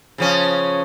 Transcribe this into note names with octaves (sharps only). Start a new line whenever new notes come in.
C#3 F3 C#4